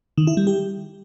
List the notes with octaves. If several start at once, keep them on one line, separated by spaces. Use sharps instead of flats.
D#3
E4
G3
G4